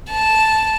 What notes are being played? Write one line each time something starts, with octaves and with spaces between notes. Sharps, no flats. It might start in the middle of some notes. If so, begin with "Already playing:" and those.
A5